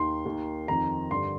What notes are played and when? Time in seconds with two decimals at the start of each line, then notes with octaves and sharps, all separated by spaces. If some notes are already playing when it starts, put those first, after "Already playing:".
Already playing: D#2 D#3 C6
0.25 D#2 D#3
0.68 F2 D#3 A#5
1.10 G2 D3 C6